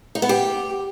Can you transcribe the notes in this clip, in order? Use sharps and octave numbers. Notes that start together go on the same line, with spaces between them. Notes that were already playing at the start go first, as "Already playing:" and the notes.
D#4
B3
G4